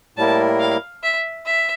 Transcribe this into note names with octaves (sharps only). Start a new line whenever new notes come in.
A2 G3 A#3 E4 A#4 A5
F5
E5
E5